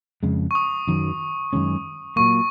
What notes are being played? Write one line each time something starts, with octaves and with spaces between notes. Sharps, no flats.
F2 C#3 G#3
C#6
D#6
F#2 D#3 F#3
F#2 D#3 G#3 C#4
A#2 F#3 A#3 C#6